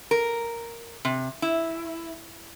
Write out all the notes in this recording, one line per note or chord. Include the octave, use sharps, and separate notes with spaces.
A#4
C3
E4